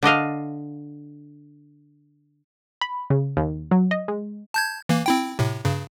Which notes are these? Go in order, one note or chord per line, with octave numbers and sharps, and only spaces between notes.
D3 D4 D#5 F5
B5
C#3
D#2
F#3
D#5
G#3
A5 G6 G#6
E3 A#3
C4 E4 G5
A2 C3
G2 C#3